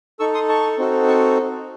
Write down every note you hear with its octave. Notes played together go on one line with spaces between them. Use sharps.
D#4 A4 C#6 E6
C6 D#6
A5 C#6
C4 D#4 F#4 A4
A5 C#6